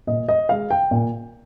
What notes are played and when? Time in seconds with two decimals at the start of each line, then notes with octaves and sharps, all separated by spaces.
0.07 A#2 D#5
0.28 D#5
0.49 G#3 F5
0.70 G5
0.91 A#2